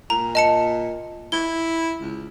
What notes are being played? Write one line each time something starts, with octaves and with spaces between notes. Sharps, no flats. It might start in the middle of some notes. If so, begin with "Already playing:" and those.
A#2 A#5
D#5 A5 C#7
E4 G7
C#2